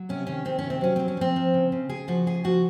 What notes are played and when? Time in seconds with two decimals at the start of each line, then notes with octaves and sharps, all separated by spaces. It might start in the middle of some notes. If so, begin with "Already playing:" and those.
Already playing: F#3
0.09 C3 C#4
0.27 D#3 C#4
0.45 D#3 C4
0.59 C#4
0.64 C3
0.70 C4
0.81 F#3 C#4
0.96 F#3 C4
1.08 C#4
1.17 F3 C4
1.36 F3
1.54 C#3
1.72 C#3
1.89 C#3 G#4
2.08 F3 F#4
2.27 C#3 G#4
2.44 F3 F#4